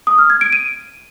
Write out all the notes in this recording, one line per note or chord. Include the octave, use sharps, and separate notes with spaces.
D#6
F6
G#6
D7
D#7